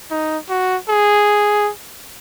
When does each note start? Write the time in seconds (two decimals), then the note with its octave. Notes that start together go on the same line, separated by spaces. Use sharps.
0.11 D#4
0.49 F#4
0.88 G#4